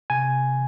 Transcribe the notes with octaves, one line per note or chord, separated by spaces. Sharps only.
C3 G#5